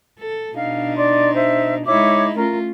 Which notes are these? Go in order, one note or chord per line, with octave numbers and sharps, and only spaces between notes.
A4
B2 D4 D#4 F5
D5 C6
C5 E5
G#3 D#4 E4 C#5 E5 D6
A3 C#4 F4 A#4